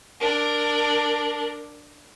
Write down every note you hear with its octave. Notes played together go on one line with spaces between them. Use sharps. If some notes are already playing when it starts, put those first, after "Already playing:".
D4 A#4